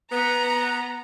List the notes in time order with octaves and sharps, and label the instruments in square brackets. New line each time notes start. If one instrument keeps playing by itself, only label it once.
[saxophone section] B3 [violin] A#5